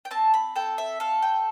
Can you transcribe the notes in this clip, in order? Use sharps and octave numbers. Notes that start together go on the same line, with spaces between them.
G5
C4 A5
B5
A4 G5
E5
A4 F5
G5